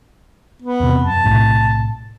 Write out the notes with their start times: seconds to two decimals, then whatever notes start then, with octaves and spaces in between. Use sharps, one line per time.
0.62 B3
0.80 E2 C3
1.04 F#2 A5
1.24 B1 A2 C3